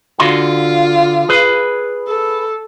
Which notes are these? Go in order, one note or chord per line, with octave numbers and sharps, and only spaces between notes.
D3 F4 F#4 C6
G#4 B4
A4